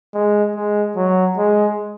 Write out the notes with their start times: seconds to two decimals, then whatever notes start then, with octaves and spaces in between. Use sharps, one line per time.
0.14 G#3
0.55 G#3
0.96 F#3
1.38 G#3